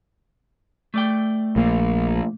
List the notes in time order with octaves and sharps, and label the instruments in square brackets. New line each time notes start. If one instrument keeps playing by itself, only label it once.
[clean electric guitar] A3 D5 G5
[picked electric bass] A#1 A#3